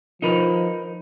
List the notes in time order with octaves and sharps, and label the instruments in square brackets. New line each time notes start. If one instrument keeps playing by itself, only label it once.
[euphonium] F3 [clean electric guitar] D#4 A#4 B4